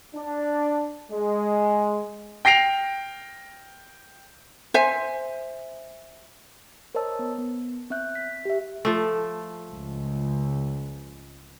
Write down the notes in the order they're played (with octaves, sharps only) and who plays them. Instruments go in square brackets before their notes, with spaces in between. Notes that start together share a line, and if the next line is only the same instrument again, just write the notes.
[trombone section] D4
G#3
[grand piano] G5 A#6 C7 D7 F7
[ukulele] C5 E5 G#5
[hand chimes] A#4 C5 C#5 D#5 A5 E6
B3
B3
C4 E5 F#6 G6
B6
G4 E5
[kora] F3 A3
[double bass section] C#2